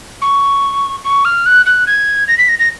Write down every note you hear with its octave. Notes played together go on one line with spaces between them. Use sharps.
C#6
C#6
F6
F#6
F#6
G#6
A#6
B6
A#6
A#6